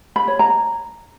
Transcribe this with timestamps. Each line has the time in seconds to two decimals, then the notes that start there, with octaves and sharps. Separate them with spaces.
0.16 B5
0.28 C#5
0.39 A#5